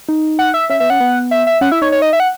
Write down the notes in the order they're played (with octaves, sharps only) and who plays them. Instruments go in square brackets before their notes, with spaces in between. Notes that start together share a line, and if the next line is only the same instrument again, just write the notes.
[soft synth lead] D#4
[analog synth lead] F#5
E5
[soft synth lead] C#4 [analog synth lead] E5
[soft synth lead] B3 [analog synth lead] E5
[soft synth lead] C#4 [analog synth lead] F#5
[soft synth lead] B3
[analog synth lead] E5
E5
[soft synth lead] C#4 [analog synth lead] F#5
[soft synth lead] E4 [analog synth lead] E5
[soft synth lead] D#4 [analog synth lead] C#5
[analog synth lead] C#5
D#5
E5
F#5